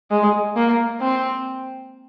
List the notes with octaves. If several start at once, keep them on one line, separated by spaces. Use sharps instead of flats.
G#3
A#3
C4